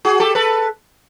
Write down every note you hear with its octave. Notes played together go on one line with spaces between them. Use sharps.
F#4 G#4
G4 A4
A4 B4